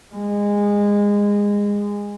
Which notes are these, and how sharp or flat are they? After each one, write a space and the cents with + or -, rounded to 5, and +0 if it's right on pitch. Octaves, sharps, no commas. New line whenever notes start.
G#3 -20